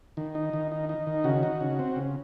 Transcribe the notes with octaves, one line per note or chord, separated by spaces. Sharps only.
D#3
D#4
D#3
D#4
D#4
D#3
C#3 F#4
D#4
C#3
C4
C#3